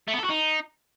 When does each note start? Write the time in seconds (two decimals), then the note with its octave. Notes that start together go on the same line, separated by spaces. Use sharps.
0.08 A3
0.13 B3
0.19 A4
0.24 F#4
0.29 D#4